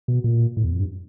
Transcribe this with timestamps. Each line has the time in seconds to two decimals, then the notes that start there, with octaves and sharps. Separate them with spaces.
0.08 B2
0.24 A#2
0.57 A2
0.64 E2
0.72 F2
0.80 G2